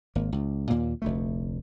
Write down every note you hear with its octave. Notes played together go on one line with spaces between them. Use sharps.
G#1 A#3
C#2
D#2 A#2 A#3
F1 D2 A3